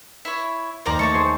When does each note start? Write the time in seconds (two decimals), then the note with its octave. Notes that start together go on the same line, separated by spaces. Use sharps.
0.25 E4 C#5
0.86 D#2 A#4 C5 D5 A#5
0.99 A3 C#5 A5 C#6
1.14 G#4 C5 G#5